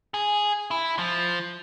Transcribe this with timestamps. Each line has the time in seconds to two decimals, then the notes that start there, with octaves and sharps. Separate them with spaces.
0.14 G#4
0.71 E4
0.99 F3